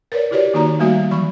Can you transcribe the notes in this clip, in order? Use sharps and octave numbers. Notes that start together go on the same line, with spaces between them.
A#4 B4 C#5 D5
E4 F#4 G4 B4 C#5 D5
D#3 A#3 D#4 F#4 A#5
G3 A3 A#3 F#4 E5 F5
E3 F#3 B5 C#6